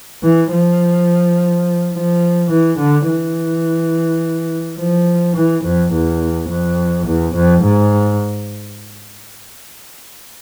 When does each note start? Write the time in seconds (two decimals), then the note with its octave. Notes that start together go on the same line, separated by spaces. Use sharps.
0.23 E3
0.52 F3
1.94 F3
2.51 E3
2.79 D3
3.08 E3
4.78 F3
5.36 E3
5.65 F2
5.93 E2
6.49 F2
7.07 E2
7.35 F2
7.64 G#2